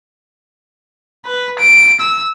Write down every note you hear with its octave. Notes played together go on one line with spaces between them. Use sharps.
B4
D7
E6